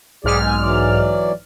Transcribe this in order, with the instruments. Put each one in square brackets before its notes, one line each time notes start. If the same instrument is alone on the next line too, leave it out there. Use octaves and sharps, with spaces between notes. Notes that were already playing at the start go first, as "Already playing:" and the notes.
[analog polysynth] B1 G#2 F6 [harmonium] G#4 D5
[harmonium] D#2 G#5
E3 F#3 D5